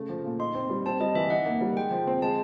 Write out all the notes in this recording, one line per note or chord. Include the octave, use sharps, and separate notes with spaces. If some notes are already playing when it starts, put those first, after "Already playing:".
Already playing: C#3 A3
F3
A#2
D#4 C6
C4
G3
C4 A5
G3 D#5
E3 E5
D#4 F#5
A#3
G3
G#3 G5
F3
C4
G#3 A5